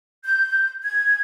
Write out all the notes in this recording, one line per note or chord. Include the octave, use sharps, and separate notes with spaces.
G6
G#6